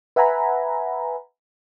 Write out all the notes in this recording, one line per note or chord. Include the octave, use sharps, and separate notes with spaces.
B4 E5 F#5 G#5 A#5 B5